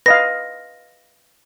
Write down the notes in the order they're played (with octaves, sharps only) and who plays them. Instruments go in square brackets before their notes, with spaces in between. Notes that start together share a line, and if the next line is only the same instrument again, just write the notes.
[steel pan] B4 D#5 F5 [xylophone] A#6